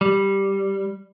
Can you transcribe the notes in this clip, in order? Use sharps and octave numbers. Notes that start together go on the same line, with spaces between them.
G3